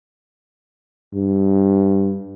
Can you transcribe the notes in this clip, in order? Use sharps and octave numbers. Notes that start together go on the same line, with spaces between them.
G2